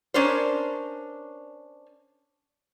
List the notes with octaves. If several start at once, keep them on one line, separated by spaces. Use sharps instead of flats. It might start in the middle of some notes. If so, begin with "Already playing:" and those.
C#4 D4 A#4 C5